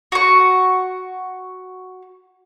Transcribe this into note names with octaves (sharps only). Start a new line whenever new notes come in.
F#4 C#6